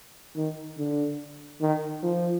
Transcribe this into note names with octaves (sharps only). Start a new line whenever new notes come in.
D#3
D3
D#3
F3